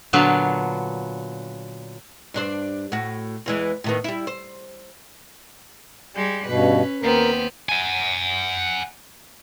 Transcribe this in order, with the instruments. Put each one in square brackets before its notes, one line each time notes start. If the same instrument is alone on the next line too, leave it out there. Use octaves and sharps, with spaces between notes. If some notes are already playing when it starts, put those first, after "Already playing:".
[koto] A#2 D3 F#3 B3 D4 F4
[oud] G2 D4 C5
A2 F#4
E2 E3 G#3
A2 D#3 B3
G3 E4
C5
[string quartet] G3 G#3
[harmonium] G2 B2 [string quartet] C#4 B4
[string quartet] D#2 B3 C4 [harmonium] A#4
[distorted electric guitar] F#5 G#5